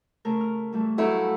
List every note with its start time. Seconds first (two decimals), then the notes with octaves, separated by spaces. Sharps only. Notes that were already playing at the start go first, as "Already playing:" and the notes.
0.25 C#3 A3 A#4
0.41 F6
0.73 E3 G3 A3
0.98 F#3 A3 E4 G4 F5
1.12 B5